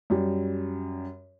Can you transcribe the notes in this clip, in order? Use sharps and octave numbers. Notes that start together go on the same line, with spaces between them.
F#2 G3